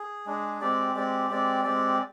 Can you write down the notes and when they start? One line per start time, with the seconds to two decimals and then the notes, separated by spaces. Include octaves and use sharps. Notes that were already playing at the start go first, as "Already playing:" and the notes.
Already playing: G#4
0.26 G#3 D4 G#4
0.61 G#3 C4 G4 D5
0.95 G#3 C4 G4 D5
1.30 G#3 C4 G4 D5
1.64 G#3 C4 G4 D5